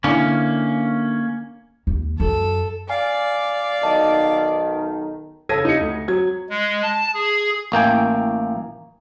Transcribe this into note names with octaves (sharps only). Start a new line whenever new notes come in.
D3 A#3 C#4 E4
D#2
F#2 A4
D5 F5 G#5
B1 D#3 A#4 D#5 A5
C#3 A4 G#6 A#6 B6 D#7
D#4 G4 C#7
D2
F#3 G#6
G#3
A5
G#4
A1 A#3 G5 G#5